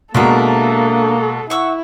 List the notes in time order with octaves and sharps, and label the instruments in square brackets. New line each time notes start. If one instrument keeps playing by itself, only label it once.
[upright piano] B2 G#3 F#4 [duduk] A#3 [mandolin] D4 A#4 E5 [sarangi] A4
[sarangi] E4 [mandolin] F#5 C#6 E6